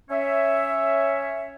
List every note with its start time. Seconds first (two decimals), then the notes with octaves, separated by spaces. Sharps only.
0.10 C#4 C#5 E5